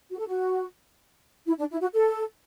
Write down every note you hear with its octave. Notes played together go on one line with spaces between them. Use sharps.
F#4
A4
F#4
E4
D4
E4
F#4
A4